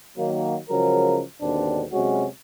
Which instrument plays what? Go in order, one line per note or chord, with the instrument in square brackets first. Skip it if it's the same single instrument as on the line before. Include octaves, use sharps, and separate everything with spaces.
[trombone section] D#3 F#3 A#3
C#3 F3 F#3 G#3 A#4
D#2 G#2 B2 D3 C4 D4
C3 F#3 G#3 C#4 F#4